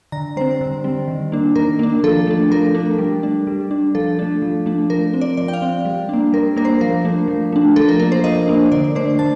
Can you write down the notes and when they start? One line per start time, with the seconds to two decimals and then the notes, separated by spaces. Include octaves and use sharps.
0.12 D3 A#5
0.37 G3 C4 C5
0.61 D3
0.84 G3 C4
1.08 D#3
1.32 A#3 D4
1.56 D#3 A#4
1.79 A#3 D4
2.04 F3 A4
2.27 A3 D4
2.51 F3 A#4
2.75 A3 D4
2.98 G3
3.23 D4
3.47 G3
3.71 D4
3.95 F3 A4
4.19 A3 D4
4.42 F3
4.66 A3 D4
4.90 F3 A#4
5.14 C4
5.21 D5
5.37 F3 D5
5.48 G5
5.54 F5
5.62 C4
5.85 G3
6.09 A#3 D4
6.33 G3 A#4
6.57 A#3 D4 A#4
6.65 C5
6.81 F3 A#4
7.05 A3 D4
7.28 F3
7.52 A3 D4
7.76 F3 A4
7.89 A#4
8.00 A#3 D4 A#4
8.12 C5
8.24 F3 D#5
8.48 A#3 D4
8.72 D3 D5
8.95 A3 D4 C5
9.19 D3 A5